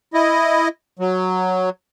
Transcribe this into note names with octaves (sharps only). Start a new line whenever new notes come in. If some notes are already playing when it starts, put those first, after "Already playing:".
E4 D#5
F#3